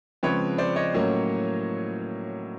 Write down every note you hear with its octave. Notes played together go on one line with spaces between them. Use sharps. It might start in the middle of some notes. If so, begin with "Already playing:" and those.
C#3 F3 G#3 C4 B4 C#5
C5 D5
C#5 D#5
A2 F#3 A#3 C#4